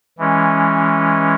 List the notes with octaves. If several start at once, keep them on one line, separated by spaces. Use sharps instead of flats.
E3 G#3 C#4